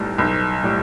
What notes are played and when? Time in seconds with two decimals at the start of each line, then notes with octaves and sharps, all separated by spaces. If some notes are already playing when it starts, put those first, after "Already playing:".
Already playing: B1 A2 G3
0.18 B1
0.63 A2 G3